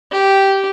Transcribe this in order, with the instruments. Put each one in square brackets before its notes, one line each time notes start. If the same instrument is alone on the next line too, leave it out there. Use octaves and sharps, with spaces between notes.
[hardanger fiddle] G4